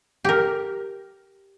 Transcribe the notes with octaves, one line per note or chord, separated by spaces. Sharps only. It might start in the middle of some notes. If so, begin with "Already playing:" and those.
G4 A#4